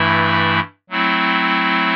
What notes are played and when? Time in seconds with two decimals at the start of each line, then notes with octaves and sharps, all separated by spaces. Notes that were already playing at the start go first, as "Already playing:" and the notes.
Already playing: G2 E3 A3 E4
0.90 F#3 A3 C4 E4